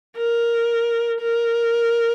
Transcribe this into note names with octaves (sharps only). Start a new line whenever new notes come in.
A#4
A#4